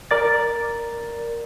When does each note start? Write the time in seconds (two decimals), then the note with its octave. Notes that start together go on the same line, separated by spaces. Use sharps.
0.11 A#4 D5 A6